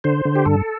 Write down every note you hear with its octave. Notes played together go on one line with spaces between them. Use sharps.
D3 C5
D3
G4
G2 A4